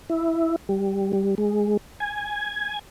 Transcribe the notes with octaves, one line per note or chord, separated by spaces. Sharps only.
E4
G3
G3
G#3
G#5